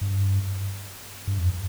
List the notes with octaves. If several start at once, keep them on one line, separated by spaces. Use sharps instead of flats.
G2
G2
F2